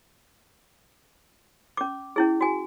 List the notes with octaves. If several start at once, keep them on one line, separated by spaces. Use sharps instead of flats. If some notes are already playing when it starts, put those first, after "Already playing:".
C#4 D6
C#4 E4 G#4
F#4 G#5